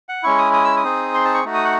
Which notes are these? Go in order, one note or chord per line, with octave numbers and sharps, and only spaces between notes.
F#5
G#3 C#4 E4 C#6
D#6
D#6
E6
D#6
C4 D#4 G#4
C6
A5
C#6
A3 D#4 F#4
D#6
F#5